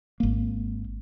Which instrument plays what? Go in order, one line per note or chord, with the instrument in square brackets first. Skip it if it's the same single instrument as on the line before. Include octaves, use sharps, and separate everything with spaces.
[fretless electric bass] G#1 A#3